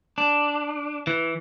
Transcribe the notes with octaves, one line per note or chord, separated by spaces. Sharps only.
D4
E3